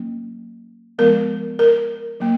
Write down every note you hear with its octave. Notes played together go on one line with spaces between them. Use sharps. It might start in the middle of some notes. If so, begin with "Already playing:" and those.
Already playing: F#3 A#3 C#4
F3 G#3 B3 A#4
A#4
F#3 A#3